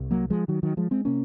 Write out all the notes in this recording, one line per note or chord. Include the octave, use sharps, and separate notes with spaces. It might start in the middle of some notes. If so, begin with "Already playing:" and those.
Already playing: C2
F#3 A#3
F3 G#3
D#3 F#3
D#3 F#3
F3 G#3
G#3 C4
C3 A#3 C#4